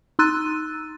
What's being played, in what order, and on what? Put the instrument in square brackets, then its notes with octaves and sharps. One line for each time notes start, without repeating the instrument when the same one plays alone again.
[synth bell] D#4 C6 E6 F#6 A6 D#7